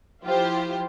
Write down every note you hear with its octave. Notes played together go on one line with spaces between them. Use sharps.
F3 E4 F4 G4 C5